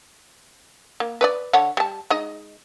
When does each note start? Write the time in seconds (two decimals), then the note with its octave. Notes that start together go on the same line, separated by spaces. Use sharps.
1.00 A#3
1.21 B4 C#5 D5
1.53 D3 C#5 F#5
1.77 G3 A5
2.10 G#3 D#4 D#5